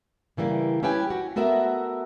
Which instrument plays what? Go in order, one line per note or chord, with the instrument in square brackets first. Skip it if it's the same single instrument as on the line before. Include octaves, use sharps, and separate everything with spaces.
[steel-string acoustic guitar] C#3 E3 G3 A#3
C#4 E4 G4 B4 G5 G#5
F#4
A3 B3 F#4 A#4 E5